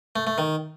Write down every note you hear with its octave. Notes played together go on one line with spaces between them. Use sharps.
A3
A3
D#3